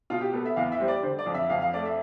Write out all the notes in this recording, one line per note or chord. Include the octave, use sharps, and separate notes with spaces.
B2 F4
G4
B3 A4
E5
E2 F5
E5
G3 C5
D5
D3 C5
D5
F2
E5
F2 F5
F5
A3 D5
E5